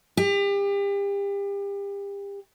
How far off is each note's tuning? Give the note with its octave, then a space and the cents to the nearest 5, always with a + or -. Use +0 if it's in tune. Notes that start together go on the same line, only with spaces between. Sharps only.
G4 +35